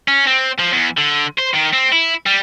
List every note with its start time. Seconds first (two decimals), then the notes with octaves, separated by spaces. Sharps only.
0.08 C#4
0.27 C4
0.59 F3
0.73 E2
0.98 D3
1.39 C5
1.55 D#3
1.73 C4
1.92 E4
2.26 G3